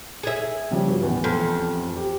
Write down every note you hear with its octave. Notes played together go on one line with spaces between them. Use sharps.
G#4 E5
C#3 F3 G3
G2 F#3
A1 E2
F2
G4